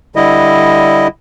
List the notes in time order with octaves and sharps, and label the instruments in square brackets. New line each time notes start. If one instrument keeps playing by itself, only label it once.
[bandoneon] D3 G3 E4 D#5